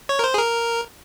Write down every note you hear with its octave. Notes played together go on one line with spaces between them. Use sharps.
C#5
A#4
C5
G#4
A#4